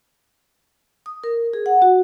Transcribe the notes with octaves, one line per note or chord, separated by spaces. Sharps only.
D#6
A#4
G#4
F#5
F#4